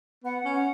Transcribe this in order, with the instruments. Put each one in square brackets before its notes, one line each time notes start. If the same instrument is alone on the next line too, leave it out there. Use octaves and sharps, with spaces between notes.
[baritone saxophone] B3 [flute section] F#5
[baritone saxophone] C#4
[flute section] F#5